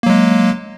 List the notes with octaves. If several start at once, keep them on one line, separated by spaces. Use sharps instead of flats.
F#3 G#3 A#3